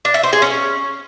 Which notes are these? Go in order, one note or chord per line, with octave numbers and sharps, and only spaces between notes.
D4
E5
C5
G#4
C#4